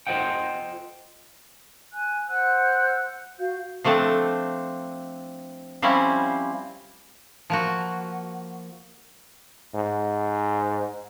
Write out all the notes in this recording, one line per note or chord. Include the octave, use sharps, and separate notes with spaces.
F4 A4 C5 D#5 F#5 G5
G#5 F#6
C5 F#5 E6 F#6
F#4 F5 G6
F3 A3 C4 D4 A5
F3 G3 C4 C#4 E4 F4
F3 A#3 F#4
G#2